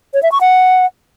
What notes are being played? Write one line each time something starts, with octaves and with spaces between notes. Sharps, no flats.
C#5
E5
C#6
F#5